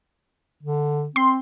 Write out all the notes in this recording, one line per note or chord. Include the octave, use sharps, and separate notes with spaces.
D3
C4 C6